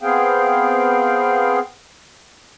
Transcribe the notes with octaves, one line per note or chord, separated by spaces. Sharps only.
B3 C4 G#4 F5 G5